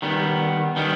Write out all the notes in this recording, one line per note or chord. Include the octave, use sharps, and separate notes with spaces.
D#3 G3 B3
D#3 G3 B3